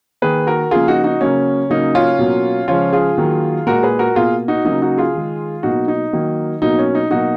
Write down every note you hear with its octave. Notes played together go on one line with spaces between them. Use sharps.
D#3 A#3 G#4 B4
F#4 A#4
C#3 F3 A#3 F4 G#4
D#4 F#4
D#4 F#4
C#3 F#3 A#3 C#4
C#3 F#3 A#3 D#4
C#4 F4
B2 F#3 A#3
C#3 F3 G#3 C#4 F4
F4 G#4
D#3 F#3 A#3
A#2 G#3 F#4 A#4
G#4 B4
F#4 A#4
B2 A#3 F4 G#4
D#4 F#4
C#3 F#3 A#3 D#4
D#4 F#4
F4 G#4
D#3 G#3
B2 F#3 A#3 D#4 F#4
D#4
D#3 F#3 A#3
B2 F#3 A#3 D#4
C#4
D#4
B2 F#3 A#3 D#4 F#4